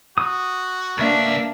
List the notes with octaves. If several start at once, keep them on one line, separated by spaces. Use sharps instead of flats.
F#4 D#6
C#2 A#3 D4 E5